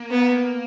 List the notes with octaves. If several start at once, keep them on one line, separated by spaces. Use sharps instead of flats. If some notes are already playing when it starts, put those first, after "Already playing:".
Already playing: A#3
B3